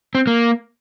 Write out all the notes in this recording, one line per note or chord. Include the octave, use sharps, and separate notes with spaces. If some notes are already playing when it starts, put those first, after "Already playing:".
C4
A#3